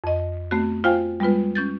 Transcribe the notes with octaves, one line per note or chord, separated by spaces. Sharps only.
F2 D#5
A3 B3 C4 F#4
F4 C5 F5 G5 G#5
G3 G#3 B3 F4 B4
C#4 G6 A6